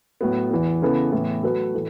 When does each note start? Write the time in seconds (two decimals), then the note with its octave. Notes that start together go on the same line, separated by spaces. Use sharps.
0.21 A2 F#3 B3
0.51 E2 E3 B3
0.82 C#3 E3 B3 A4
1.12 A2 E3 B3
1.43 F#3 A3 F#4 B4
1.74 A2 E3 A4